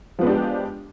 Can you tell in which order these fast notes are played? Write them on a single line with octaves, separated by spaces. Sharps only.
F3 B3 G#3 D4 G4